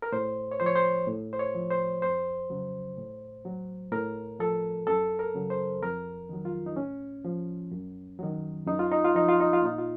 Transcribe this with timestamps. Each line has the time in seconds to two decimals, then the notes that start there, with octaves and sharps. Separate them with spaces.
0.02 A#4
0.12 A2 C5
0.51 C#5
0.60 F3 C5
0.66 C#5
0.76 C5
1.07 A2
1.33 C5
1.39 C#5
1.55 F3
1.71 C5
2.02 F2 C5
2.50 C#3 F#3
2.98 A2
3.45 F#3
3.92 A2 A#4
4.39 F3 A4
4.87 F#2 A4
5.19 A#4
5.35 C#3 F#3
5.50 C5
5.82 F2 A#4
6.29 D#3 F#3
6.45 F4
6.66 D#4
6.76 A2 C#4
7.25 F3
7.71 F#2
8.19 D#3 F#3
8.67 F#2 D#4
8.79 F4
8.91 D#4
9.04 F4
9.15 F3 D#4
9.28 F4
9.40 D#4
9.53 F4
9.62 A#2 D#4
9.78 F4